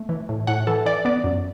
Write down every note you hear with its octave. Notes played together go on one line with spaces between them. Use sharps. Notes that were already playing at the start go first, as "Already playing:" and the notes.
Already playing: A3
E3
A2
A2 F#5
E3 A4
E3 D5
B3 D5
F#2